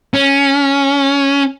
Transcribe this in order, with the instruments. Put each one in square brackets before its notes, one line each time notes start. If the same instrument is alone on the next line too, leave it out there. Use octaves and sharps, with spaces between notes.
[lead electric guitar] C#4